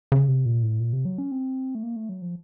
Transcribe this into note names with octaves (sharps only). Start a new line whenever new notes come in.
C#3
C3
A#2
A2
A#2
C3
F#3
C#4
C4
A3
A#3
A3
F#3
F3